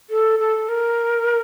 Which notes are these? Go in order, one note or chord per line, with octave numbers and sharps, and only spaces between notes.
A4
A4
A#4